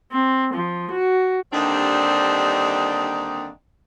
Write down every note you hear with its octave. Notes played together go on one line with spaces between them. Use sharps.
C4
F3
F#4
D#2 D3 G3 C4 D4 D#4